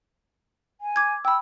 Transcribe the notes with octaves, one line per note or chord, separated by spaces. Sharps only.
G#5
D6 G#6
G5 B5 E6